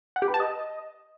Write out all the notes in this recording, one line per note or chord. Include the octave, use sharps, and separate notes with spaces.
F#5
G4
B4
A5
D#5